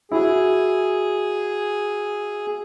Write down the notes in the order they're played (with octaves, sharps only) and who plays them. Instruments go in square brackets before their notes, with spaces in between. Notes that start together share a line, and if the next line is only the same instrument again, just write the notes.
[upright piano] E4 F#4 [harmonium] G#4